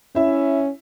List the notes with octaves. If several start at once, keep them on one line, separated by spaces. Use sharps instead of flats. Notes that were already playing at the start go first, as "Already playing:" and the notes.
C#4 E4 E5